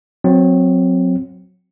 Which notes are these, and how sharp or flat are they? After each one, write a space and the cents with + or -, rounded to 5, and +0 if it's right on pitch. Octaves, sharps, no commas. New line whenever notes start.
F#3 -20 C4 -5